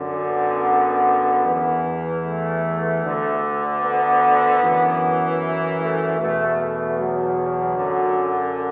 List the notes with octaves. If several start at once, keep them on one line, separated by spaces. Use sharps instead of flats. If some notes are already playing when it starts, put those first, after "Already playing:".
Already playing: F#2 D3
B3
E2 E3
A3
D2 D3
B3
F#2 E3
E4
A3
E2 B2 A3
A3
F#3
F#2 D3